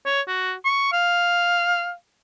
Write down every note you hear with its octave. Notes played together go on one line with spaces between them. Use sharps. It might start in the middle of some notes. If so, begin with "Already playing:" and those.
C#5
F#4
C#6
F5